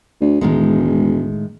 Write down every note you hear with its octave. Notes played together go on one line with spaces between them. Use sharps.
D2
E1 A2 D#3 G#3